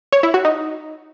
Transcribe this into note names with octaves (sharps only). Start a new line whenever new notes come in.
C#5
E4
F#4
D#4